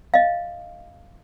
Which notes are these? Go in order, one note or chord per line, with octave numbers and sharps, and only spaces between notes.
D#5 F5